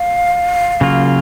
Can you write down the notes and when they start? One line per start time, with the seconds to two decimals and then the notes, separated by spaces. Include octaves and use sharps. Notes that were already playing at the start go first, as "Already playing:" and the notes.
Already playing: F5
0.81 C#3 F#3 A#3 F4